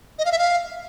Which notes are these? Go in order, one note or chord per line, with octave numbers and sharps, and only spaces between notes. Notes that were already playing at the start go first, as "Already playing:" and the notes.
D#5
F5
E5
F5